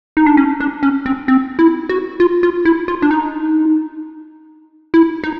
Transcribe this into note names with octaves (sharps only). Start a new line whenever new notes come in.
D#4
D4
C#4
D4
C#4
C4
C4
E4
F#4
F4
F4
E4
F4
D4
D#4
E4
D#4